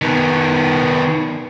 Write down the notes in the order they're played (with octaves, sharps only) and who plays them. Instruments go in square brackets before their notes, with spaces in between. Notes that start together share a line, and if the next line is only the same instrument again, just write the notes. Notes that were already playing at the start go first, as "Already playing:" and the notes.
[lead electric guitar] D#3 B3